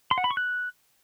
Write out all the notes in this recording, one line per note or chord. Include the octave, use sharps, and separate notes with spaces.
C6
F#5
B5
C#6
F#6